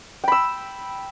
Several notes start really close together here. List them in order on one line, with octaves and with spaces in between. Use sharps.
G5 B5 E6